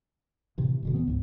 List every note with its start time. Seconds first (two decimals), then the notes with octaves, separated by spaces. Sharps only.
0.58 A2 C3 E3
0.83 E1 B2 D3
0.94 E3 B3
1.07 C#2 G#2